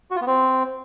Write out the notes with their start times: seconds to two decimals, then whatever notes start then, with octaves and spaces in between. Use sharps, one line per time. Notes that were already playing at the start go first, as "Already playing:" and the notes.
0.11 F#4
0.16 F4
0.21 B3
0.27 C4